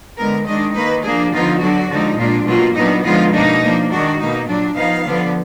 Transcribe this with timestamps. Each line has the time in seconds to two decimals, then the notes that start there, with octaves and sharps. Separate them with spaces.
0.17 D3 G#3 B3 A#4
0.46 D#3 G#3 D4 D#5
0.75 D#3 A#3 D#4 B4
1.04 F3 A#3 D4 G#4
1.32 D3 F3 B3 D#4 F4
1.61 D3 F#3 D4 F#4
1.90 D3 F3 G#3 D#4
2.18 A#2 G#3 D4 F4
2.47 B2 F#3 A#3 F4
2.75 A#2 F#3 B3 D4 D#4
3.04 D3 F3 G#3 B3 D#4 F4
3.33 B2 A#3 D4 D#4
3.61 F3 A#3 D4
3.90 D#3 G#3 D4 F#4
4.19 B2 A#3 D#4
4.48 A#2 F#3 D4
4.76 F3 B3 D#4 F5
5.05 D3 F3 B3 D4